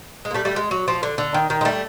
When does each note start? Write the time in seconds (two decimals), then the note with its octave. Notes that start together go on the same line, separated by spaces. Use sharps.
0.25 G#3
0.31 A#3
0.34 G3 A3
0.45 G3 A3
0.56 G#3
0.71 F#3
0.88 F3
1.03 D3
1.18 D3
1.34 D#3
1.50 D#3
1.61 G#3
1.65 G3 A3